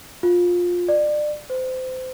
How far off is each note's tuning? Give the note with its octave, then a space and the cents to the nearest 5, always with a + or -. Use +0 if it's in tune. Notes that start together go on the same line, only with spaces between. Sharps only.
F4 +15
D5 +30
C5 -25